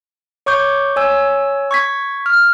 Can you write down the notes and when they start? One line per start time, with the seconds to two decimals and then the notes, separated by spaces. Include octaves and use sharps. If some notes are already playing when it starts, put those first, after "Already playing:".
0.46 C#5 C#6 D6 G6
0.96 C#5 G#5 E6
1.71 C#6 G#6 B6
2.26 F6